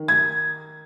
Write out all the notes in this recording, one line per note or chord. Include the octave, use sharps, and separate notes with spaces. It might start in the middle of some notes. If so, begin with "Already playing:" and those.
Already playing: D#3
G#6